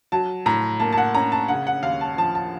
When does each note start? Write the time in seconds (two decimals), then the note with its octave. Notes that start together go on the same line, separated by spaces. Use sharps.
0.12 F#3 A5
0.46 A2 A#5
0.80 A#3 A5
0.93 A5
0.98 F#5
1.15 C#4 A#5
1.32 A5
1.48 C#3 F#5
1.67 F#5
1.83 D#2 F5
2.01 A5
2.17 F3 A5
2.35 A5